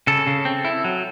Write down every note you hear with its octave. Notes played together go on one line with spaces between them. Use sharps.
C#3 A4
C#3
C4
E4
F#3